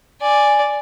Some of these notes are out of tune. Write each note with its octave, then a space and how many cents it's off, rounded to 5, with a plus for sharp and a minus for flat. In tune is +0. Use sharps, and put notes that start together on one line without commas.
D5 +0 G#5 +0